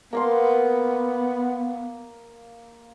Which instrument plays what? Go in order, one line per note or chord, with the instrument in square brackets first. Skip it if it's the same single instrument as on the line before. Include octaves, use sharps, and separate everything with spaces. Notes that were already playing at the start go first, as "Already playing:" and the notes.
[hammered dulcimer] A#3 F5 C6 [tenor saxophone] B3